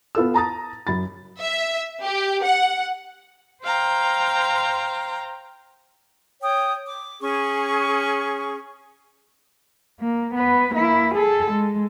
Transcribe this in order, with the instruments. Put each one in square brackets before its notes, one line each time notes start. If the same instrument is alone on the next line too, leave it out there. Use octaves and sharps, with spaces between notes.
[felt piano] B3 F4 A4 E6
A5 A#5 D#6 A6
F#2 B5 A6
[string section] E5
G4
F#5
[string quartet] C5 F5 G5 A#5
[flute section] C#5 G5 D#6
D6
C#4 G#4 C#6
[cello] A#3
B3 B4
A#3 E4
G#4 A4
G#3